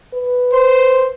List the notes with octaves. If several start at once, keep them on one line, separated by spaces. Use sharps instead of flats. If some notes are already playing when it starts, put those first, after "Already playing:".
B4
C5